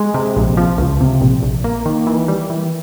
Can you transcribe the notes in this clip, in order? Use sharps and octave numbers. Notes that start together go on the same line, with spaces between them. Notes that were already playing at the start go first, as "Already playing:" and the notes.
Already playing: G#3
C3
A#1
F3
C#2
C3
A#1
A#1
A#3
D#3
E3
G3
E3